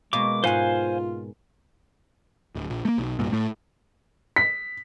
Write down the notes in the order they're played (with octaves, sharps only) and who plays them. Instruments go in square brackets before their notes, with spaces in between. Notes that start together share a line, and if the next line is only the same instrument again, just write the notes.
[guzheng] B2 A#3 [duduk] G#3 [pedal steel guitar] D6
[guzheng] G#2 F#5 [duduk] F4 [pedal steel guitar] C5 F5 G#5
[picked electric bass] D1
A#1
A3 A#3
B1
B1 G2 A#2
A2 A3
[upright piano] B6